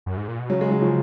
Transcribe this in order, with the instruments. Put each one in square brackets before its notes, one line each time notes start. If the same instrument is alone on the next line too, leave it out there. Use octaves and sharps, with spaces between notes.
[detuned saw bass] F#2
G#2
A#2
B2
[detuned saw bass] C#3 [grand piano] F#3
[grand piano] G#3
F#3
F3